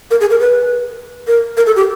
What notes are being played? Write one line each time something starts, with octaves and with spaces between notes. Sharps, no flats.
A#4
G#4
A#4
B4
A#4
A#4
A4
G4